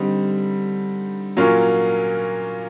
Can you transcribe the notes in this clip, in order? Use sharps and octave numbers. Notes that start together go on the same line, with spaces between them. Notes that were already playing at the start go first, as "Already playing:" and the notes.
Already playing: D3 G3 C4 D#4
A#2 F#3 A#3 C#4 F4